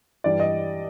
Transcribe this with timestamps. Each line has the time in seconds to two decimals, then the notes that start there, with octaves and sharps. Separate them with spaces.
0.24 G2 E3 G3 D5
0.40 D#5